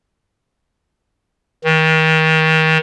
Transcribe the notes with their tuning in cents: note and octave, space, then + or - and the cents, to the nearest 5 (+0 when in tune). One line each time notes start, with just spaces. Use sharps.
D#3 +35